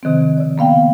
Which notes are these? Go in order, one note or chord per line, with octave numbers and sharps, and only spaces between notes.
C3 D#3 F3 C4
C#3 D5
A#3 B3 F5 G5